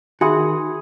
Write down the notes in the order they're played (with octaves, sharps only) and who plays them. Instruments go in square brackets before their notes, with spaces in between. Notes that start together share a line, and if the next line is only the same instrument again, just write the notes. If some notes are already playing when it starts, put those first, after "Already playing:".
[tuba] D#3 [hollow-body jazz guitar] F#4 F#5 [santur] G#4 [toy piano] E5 B5 C6